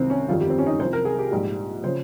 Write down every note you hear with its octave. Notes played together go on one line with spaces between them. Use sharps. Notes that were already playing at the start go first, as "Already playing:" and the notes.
Already playing: C2 C3 D#3 C4
C#4
G1 F2 D#3 G3 F4
G4
C4
C#4
D#4
C2 C3 F3 C5
A#4
G#4
G4
A#1 G#2 G3
C#3 F3 C5